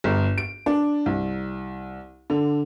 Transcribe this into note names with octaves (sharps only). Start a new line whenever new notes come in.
G1
D7
D4
C2
D3